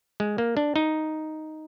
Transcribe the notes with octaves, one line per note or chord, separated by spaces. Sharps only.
G#3
A#3
D4
D#4